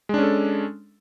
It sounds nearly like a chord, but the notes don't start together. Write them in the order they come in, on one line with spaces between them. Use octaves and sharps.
G#3 D4 C#4 A4